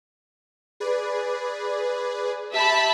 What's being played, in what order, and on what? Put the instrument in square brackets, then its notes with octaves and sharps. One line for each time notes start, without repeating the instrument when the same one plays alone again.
[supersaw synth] G#4 B4 D5
[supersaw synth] G4 [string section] E5 A5 B5